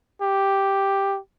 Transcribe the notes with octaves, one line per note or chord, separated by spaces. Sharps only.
G4